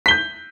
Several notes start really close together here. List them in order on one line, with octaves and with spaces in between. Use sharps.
B6 G7 G6